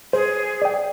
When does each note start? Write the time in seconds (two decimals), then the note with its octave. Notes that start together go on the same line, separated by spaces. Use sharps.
0.13 G#4 C5
0.62 D5 G5